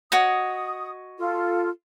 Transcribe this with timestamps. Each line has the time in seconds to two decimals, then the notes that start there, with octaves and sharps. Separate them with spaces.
0.12 F#4 C#5 D#5 D#6
1.18 F4 A4